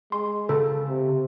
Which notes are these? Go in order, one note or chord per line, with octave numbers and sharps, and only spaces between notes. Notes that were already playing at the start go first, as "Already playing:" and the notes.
G#3 C6
C#3 A4 A5
C3